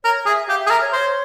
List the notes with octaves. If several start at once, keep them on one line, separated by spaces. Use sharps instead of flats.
A#4 C#5
G#4 E5
G4 F5
E5
G#4
A#4 E5
C#5
C5 C#5